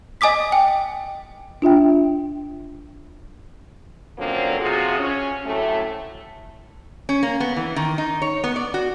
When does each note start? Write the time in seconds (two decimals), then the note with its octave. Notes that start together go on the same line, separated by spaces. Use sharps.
0.21 D#5 G#5 D6 D#6 B6
0.52 G5
1.62 D4 F4 E5 G5
4.18 D3 F3 F#3 A#3 C4 C#4
4.61 C3 F3 F4 F#4 G#4
4.99 C#4
5.46 A2 C3 F#3 A3
7.09 C#4
7.23 A#3
7.40 B3
7.56 E3
7.76 D#3
7.98 D#4
8.22 C#5
8.44 B3
8.56 D5
8.74 F#4